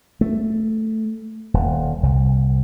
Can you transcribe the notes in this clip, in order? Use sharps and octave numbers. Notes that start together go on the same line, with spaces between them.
A3
D#1
C2